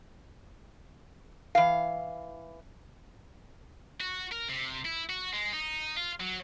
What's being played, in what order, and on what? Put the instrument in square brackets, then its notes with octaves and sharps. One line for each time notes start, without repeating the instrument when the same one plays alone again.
[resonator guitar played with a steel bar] E3 F5
[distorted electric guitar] F#4
A#4
C3
E4
F#4
G#3
D#4
F4
F#3